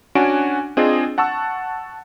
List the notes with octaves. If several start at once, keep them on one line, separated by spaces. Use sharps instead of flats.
C#4 D4 F#4 G#5 D7
C4 D4 F4 G#4 D#5
F#5 A5 C#6 E6